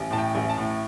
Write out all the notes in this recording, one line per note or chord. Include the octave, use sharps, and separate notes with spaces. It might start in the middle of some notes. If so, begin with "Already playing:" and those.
Already playing: A1
A2 A5
G5
A1
A5
A2